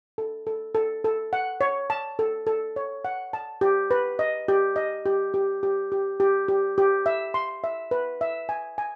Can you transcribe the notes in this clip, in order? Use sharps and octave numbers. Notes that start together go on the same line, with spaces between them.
A4
A4
A4
A4
F#5
C#5
A5
A4
A4
C#5
F#5
A5
G4
B4
D#5
G4
D#5
G4
G4
G4
G4
G4
G4
G4
E5
C6
E5
B4
E5
G#5
G#5